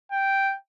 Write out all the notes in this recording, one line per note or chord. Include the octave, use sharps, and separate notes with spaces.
G5